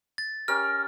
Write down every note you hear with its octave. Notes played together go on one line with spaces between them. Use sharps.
A6
C#4 G4 A#4 F6